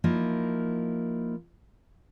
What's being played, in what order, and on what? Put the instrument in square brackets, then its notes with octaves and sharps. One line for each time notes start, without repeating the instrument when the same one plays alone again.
[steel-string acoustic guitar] F3 A#3 D#4 E4